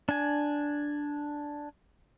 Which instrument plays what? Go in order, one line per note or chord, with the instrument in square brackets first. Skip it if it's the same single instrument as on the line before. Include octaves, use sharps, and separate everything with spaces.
[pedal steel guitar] D4 G#5